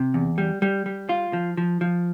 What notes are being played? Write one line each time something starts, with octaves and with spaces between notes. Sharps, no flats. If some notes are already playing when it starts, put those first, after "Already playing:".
Already playing: C3
E2
G3
G3
G3
F4
F3
F3
F3